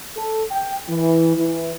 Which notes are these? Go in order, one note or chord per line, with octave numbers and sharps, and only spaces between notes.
A4
G5
E3
E3